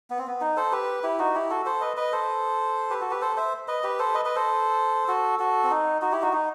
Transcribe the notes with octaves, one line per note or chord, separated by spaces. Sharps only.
B3
C4
B3
D#4
A4 C5
G4 B4
E4 G4
D#4 F#4
E4 G4
F#4 A4
A4 C5
B4 D#5
B4 D#5
A4 C5
G4 B4
F#4 A4
G4 B4
A4 C5
C5 E5
B4 D#5
G4 B4
A4 C5
B4 D#5
B4 D#5
A4 C5
F#4 A4
F#4 A4
C4
D#4
D#4 F#4
E4 G4
D#4 F#4
D#4